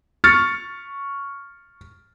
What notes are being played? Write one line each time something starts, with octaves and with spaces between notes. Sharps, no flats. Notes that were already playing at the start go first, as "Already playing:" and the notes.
C#6 F6 A6 C#7